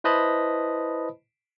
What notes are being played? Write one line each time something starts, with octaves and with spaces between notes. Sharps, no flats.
E4 B4 C5 D#5 A5 B5